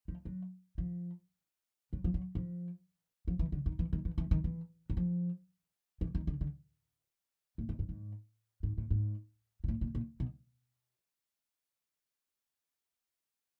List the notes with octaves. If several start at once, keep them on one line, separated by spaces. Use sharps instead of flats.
F3
F#3
F3
F#3
F3
F#3
F3
F3
E3
D3
D#3
E3
D#3
E3
E3
D#3
E3
F#3
F3
E3
D#3
D3
D3
A2
G#2
G2
G#2
G#2
A2
G#2
A#2
A2
A#2
A#2
B2